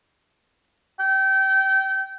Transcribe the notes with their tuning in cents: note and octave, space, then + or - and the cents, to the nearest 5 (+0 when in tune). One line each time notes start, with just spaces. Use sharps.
G5 -25